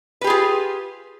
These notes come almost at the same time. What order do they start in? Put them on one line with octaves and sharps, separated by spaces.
B4 G4 G#4 F4